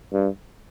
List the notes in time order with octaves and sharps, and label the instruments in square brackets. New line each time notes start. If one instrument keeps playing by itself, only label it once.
[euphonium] G2